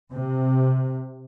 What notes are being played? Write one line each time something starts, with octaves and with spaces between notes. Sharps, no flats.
C3